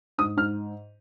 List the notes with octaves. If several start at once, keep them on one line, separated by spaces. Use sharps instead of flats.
G#2 D#6
G#2 F6